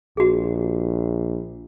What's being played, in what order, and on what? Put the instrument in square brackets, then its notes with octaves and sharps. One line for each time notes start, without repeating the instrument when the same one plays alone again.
[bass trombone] A#1 [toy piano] F#4 G#4